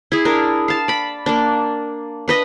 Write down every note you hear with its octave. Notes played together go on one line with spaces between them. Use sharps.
E4 G#4
D4 A#4
F5 A5
D5 B5
A#3 D4
D4 B4 D#5